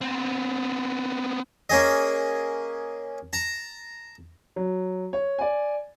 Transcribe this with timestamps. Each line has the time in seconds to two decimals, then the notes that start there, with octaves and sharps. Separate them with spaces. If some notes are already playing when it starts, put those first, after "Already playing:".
0.01 B3 C4
1.70 A#3 C#4 G#4 D#5
3.33 A5 A#5
4.56 F#3
5.13 C#5
5.38 D5 G#5